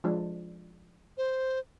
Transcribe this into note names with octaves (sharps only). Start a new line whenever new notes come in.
F3 G#3 D4
C5